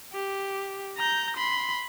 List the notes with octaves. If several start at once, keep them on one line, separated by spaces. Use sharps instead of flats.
G4
A#5 G6
B5 C6